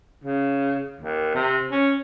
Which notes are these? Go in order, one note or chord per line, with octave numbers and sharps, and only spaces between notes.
C#3
D#2
C3
C#4